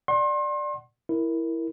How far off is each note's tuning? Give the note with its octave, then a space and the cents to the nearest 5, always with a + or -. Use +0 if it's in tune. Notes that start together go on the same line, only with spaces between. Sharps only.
D5 +10 F#5 +15 C6 +35
E4 +0 A#4 +0